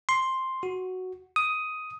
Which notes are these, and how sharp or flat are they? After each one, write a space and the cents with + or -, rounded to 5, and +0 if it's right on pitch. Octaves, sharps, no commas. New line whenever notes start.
C6 +5
F#4 +0
D#6 +10